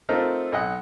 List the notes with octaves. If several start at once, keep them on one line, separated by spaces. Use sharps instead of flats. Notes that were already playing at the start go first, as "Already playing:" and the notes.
A3 C4 D#4 F4 A4 A#4
B1 D#5 F#5